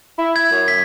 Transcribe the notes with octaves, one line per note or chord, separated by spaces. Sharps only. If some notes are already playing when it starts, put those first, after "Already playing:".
E4
G#6
F#2
B6